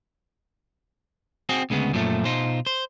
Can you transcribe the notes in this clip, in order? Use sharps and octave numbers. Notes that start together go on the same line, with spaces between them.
C4 F#4 G#4
D2 C#3 G#3 B3
F#2 A#2 F3 G3 A3
B2 D#4 F4 C5
C5